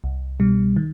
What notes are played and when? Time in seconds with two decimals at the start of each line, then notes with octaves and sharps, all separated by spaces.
0.04 C2
0.40 B2 G3
0.76 D#3